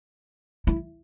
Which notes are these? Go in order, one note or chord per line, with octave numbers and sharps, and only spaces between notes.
E4